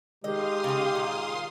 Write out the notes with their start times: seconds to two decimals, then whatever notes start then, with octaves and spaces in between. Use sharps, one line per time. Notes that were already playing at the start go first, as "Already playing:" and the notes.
0.24 D#3 G#3 G4 D#5 F5 C6 D#6
0.64 C#3 D#4
0.95 A#2